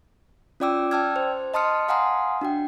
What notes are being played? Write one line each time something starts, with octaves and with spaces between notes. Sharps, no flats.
C#4 F4 D5 G5 D6 E6
D5 G5 A5 E6 F6 G#6
C5
D#5 A5 C6 D#6 F6 C#7
F5 F#5 G#5 A#5 C6 D#6
D4 F#4 G5